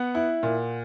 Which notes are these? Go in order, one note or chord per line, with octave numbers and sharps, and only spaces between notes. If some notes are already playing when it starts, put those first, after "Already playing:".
Already playing: B3 F#5
E4
A#2